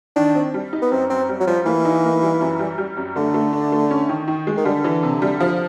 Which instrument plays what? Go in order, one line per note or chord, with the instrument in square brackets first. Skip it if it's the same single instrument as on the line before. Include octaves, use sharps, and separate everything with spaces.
[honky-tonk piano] D#3 [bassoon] D4
[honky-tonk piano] C4
G3
D#4
[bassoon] B3
[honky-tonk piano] F#2 [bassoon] C4
[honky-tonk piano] F#2 [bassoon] C4
[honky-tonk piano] G3
[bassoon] F#3
[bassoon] F3 [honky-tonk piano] G3
[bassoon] E3 [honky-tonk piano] A#3
[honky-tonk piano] D#4
A#3
G3
F#2
G3
G3
F#2
[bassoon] D3 [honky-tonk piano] A3
[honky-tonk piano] A3
D4
A3
C#4
D#3
D#3
G#3
[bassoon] D#3
[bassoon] D3 [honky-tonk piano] G3
[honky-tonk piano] E3
C3
G3
F3